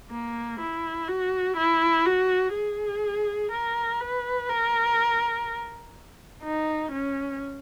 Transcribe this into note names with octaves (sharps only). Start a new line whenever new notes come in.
A#3
E4
F#4
E4
F#4
G#4
A#4
B4
A#4
D#4
C#4